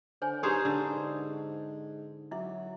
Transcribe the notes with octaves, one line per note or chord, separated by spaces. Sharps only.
D3 C5 C#5 G#5
D#4 G4 G#4 B4 C5
G#2 D3
F#3 E4 E5